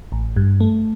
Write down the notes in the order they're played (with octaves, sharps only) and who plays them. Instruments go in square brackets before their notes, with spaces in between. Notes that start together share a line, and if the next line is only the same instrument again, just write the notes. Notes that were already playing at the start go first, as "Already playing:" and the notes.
[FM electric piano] A1
G2
A3